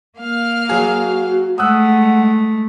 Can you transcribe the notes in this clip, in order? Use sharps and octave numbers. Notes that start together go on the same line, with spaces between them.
A#3 F5 F6
F#3 F#4 G#4
G#3 A3 F#5 D#6 E6 F#6